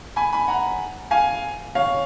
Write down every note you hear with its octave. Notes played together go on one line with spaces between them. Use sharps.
G#5 B5
G#5 B5
F#5 A#5
F5 G#5
C#5 F5